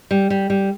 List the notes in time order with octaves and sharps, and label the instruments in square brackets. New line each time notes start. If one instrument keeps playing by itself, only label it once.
[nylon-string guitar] G3
G3
G3